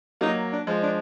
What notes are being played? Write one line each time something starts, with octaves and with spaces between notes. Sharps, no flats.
F#3 A#3 D#4
D4
F3 G#3
D4